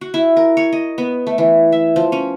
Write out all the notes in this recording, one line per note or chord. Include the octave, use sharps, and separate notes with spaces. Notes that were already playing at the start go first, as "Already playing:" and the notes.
F#4
E4
A#4
C#5
D#5
B3
A3
E3
E5
F3
C#4